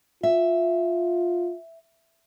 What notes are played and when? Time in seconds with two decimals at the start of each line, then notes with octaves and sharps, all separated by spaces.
0.23 F4 E5